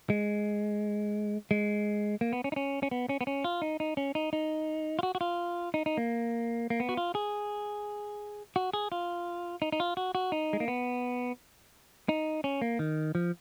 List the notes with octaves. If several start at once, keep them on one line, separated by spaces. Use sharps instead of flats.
G#3
G#3
A#3
B3
C#4
D#4
C#4
C#4
B3
C#4
B3
C#4
F4
D#4
D#4
C#4
D#4
D#4
F4
F#4
F#4
F4
D#4
D#4
A#3
A#3
B3
F#4
F4
G#4
F#4
G#4
F4
D#4
D#4
F4
F#4
F#4
D#4
G#3
A#3
B3
D#4
C#4
A#3
D#3
F3